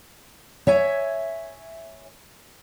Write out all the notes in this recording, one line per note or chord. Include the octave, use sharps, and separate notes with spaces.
C#5 E5 G#5